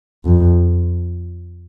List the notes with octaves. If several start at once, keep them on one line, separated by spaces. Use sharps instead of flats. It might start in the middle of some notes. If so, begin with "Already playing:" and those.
F2